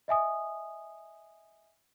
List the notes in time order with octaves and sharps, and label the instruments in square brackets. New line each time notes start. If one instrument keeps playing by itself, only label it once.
[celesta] D#5 E5 G#5 D#6